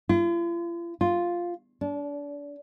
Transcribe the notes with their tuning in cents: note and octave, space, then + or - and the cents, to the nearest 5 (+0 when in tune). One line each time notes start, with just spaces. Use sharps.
F4 -45
F4 +0
D4 -30